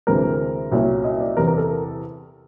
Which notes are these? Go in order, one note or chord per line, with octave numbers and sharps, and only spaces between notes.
D2 C3 E3 G#3 C4 A#4
C2 A#2 F#3 A#3 C#4
D#5
D5
E2 C3 E3 A#4
A#4
A4